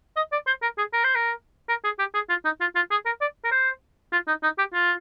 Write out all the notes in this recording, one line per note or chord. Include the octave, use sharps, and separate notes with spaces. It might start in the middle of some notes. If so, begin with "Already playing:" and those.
D#5
D5
C5
A#4
G#4
A#4
C5
A#4
A#4
G#4
G4
G#4
F4
D#4
F4
F4
G#4
A#4
D5
A#4
C5
F4
D#4
D#4
G4
F4